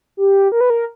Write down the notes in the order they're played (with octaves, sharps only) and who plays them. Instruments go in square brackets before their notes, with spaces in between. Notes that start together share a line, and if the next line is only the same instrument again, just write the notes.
[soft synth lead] G4
A#4
B4
A#4